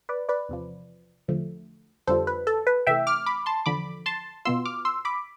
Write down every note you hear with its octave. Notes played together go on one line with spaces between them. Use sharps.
B4 D5
B4 D5
E2 C3 F3
E2 D3 F3 A3
F2 D3 G3 D4 F4 A4 C5
B4
A4
B4
C3 E3 A3 E5 G5
D6 F6
B5 D6
A5 C6
E2 D3 F3 B5 D6
A5 C6
B2 B3 F4 C6 E6
D6 F6
C6 E6
B5 D6